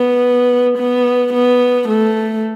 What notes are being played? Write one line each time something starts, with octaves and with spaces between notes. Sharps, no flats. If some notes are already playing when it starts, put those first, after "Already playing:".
Already playing: B3
B3
B3
A3